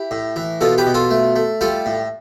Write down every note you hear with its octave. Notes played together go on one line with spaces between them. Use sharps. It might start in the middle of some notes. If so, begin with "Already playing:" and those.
Already playing: E4 G4
A2
E3
B2 F4 A4
G4 B4
B2
F4 A4
A3
A3
G3 F4 A4
A2